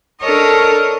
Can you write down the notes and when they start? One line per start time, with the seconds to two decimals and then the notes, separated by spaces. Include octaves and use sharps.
0.20 D4 A4 A#4 C#5 D#5